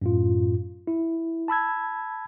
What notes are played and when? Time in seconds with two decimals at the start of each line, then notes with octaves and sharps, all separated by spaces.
0.02 F#2 A2 F4
0.87 E4
1.48 A5 B5 E6 G#6